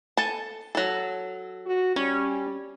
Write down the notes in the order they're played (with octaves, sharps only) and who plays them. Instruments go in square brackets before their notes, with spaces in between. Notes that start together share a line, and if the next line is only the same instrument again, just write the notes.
[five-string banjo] A4 G#5 A5
F#3 A4
[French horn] F#4
[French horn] G3 [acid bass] C#4 [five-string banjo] C#5